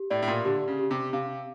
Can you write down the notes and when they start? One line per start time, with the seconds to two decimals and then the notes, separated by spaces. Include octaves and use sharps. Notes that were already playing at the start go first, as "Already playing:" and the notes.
Already playing: G4
0.10 A2 D5
0.22 A2
0.28 A#2
0.45 D3 G4
0.68 C#3
0.79 G4
0.91 C3
1.13 C3 F5